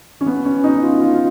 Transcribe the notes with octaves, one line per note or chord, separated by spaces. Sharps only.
C#4
B3
C#4
D#4
F4
F4
F4